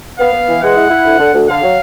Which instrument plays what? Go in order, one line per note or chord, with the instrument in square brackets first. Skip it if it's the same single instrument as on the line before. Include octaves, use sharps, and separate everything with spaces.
[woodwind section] B3 [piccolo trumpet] F5
[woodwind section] B3
E3
[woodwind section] G#3 [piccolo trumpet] F#5
[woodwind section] E4
E4
D2
D3
D2
[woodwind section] D3 [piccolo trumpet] F5
[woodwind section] F#3